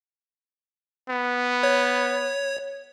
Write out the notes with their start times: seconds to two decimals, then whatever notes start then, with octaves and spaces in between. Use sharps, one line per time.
1.09 B3
1.63 C#5